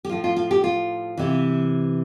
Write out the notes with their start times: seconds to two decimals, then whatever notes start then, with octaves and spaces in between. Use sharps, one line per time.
0.05 G4
0.09 A2 F3 F4
0.24 F4
0.36 F4
0.51 G4
0.64 F4
1.17 C3 E3